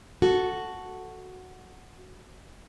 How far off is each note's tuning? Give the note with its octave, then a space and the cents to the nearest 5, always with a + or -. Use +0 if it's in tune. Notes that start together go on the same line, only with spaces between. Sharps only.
F#4 +0 A4 +0